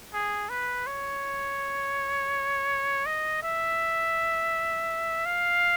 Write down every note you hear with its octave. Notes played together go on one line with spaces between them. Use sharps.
G#4
B4
C#5
D#5
E5
F5